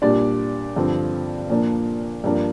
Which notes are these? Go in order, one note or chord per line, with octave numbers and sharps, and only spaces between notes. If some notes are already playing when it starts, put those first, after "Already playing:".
A#2 G3 D4 D5
G2 D3 F3 C4
A#2 F3 A#3 D4
G2 F3 A#3 D4